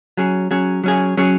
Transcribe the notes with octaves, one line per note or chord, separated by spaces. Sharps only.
F#3 C#4 G#4
F#3 C#4 G#4
F#3 C#4 G#4
F#3 C#4 G#4